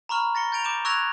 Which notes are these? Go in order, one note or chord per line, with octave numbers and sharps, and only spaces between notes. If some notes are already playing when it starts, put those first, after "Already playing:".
A#5 B5 C#6 F6
A6 A#6 C#7 G7
G6 A6 D7 F7
D6 G6 D7 E7
C#6 E6 F#6 G#6 A#6 F7